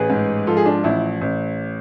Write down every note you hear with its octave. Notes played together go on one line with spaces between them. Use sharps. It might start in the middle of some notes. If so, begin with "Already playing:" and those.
Already playing: A1 G#4 B4
G#2
F3 F4 A4
G#4
D4 F4
A1 E4
A1